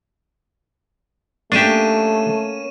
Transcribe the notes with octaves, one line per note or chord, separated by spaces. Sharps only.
A3 A#3 C#4 D4 G4 C#6 D#7 E7